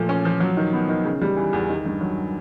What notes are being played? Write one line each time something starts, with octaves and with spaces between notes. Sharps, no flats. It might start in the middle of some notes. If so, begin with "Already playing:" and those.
Already playing: A#2 F3 A3
C#4
F3
F#3
D#3
B3
D#3
C#3
G3
E3
E2
D#3
G2
F#3